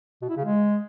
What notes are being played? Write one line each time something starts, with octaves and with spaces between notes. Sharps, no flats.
B2
E4
C#3
G#3